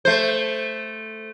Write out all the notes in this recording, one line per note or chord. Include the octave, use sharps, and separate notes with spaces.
A3 C5